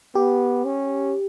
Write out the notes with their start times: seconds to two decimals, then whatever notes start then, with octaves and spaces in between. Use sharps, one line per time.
0.15 B3 G4
0.65 C#4